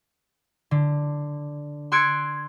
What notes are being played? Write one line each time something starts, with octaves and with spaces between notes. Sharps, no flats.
D3
C6 E6 F#6 G#6 C#7 D7